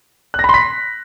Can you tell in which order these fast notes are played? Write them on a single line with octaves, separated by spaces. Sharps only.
F#6 A#6 B5 C6 B6